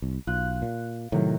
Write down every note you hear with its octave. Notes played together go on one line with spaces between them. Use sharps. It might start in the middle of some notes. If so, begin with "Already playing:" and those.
C2
B1 F4 F#6
A#2
A2 C3 D#3 F#3